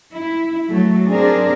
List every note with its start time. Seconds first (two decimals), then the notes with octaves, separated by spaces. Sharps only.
0.14 E4
0.67 F#3 A3
1.08 C4 D4 G#4 A#4